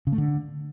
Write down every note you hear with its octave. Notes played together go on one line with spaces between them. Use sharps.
C#3
A3
D3